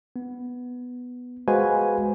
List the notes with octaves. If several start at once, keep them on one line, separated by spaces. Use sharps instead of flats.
B3
G#3 F#4 B4 C5 F5 G#5